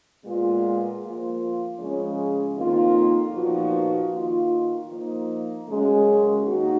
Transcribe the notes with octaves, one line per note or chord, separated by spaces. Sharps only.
A#2 G#3 B3 F4
F3 A#3 F4
C#3 F3 G#3 C#4
F2 D#3 A#3 F4
A#2 F3 B3 D#4 F#4
D#3 A#3 F4
F3 A#3 D#4
F#2 C#3 G#3 C#4
D#3 A#3 D#4 F#4